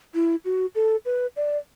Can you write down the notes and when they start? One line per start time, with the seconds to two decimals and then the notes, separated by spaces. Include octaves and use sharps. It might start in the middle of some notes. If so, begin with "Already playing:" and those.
0.14 E4
0.45 F#4
0.75 A4
1.05 B4
1.36 D5